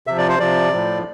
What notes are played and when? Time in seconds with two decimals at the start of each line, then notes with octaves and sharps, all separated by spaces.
0.07 C3 F3 E5
0.18 D5
0.29 C5
0.40 C3 F3 D5
0.73 A2 F3